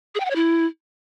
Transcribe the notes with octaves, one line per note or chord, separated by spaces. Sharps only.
G#4
G5
F#5
C#5
E4